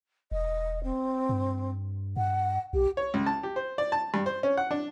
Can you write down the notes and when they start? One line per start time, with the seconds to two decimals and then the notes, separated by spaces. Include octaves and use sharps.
0.31 E1 D#5
0.83 C4
1.29 G2
2.17 G2 F#5
2.73 B1 G4
2.97 C#5
3.14 C#2
3.26 A5
3.43 G4
3.56 C5
3.78 D5
3.92 A5
4.14 G2
4.26 C5
4.43 C#4
4.57 F#5
4.71 D4